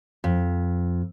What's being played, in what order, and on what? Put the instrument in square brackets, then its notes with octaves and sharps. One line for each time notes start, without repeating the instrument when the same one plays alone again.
[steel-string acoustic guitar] F2